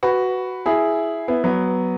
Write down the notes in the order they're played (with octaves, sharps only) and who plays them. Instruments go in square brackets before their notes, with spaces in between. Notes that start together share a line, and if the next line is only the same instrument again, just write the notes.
[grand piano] F#4 B4
E4 G#4
B3 E4
F#3 B3